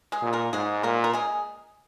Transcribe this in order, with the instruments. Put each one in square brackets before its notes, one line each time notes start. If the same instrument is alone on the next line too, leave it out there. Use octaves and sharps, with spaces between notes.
[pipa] G#3 G#4
[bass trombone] A#2
[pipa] A#3 A#4
[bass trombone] G#2 [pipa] G#3 G#4
[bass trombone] A#2 [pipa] A#3 A#4
[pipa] A#4
G#3 G#4